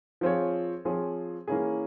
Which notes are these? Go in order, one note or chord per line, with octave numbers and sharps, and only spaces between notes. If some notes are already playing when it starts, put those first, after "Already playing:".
F3 C4 F4 G#4 C#5
F3 C4 F4 G#4 C#5
E3 A#3 C#4 E4 G#4